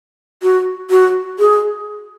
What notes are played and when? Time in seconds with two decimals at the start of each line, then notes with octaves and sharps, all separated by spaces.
0.42 F#4
0.90 F#4
1.39 G#4